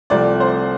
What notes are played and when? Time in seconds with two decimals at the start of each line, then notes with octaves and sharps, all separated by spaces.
0.10 C2 C3 F3 A3 C4 D5
0.40 C5